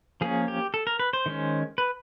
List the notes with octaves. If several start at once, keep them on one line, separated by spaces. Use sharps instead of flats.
F3 A#3 C#4 G#4
G4
A4
A#4
B4
C5
D#3 G#3 C#4
B4